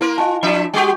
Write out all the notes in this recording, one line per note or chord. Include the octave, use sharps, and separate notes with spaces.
A#3 E4 A#4 C6
F4 D#5 G#5 A5
F3 D4 E5 B5
G3 F#4 G4 G#5 C#6